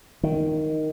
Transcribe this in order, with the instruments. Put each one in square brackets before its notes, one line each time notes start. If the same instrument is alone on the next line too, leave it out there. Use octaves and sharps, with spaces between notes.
[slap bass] D#3